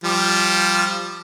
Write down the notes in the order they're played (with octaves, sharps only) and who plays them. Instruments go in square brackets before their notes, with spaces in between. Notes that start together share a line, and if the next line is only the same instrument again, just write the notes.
[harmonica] F3 G3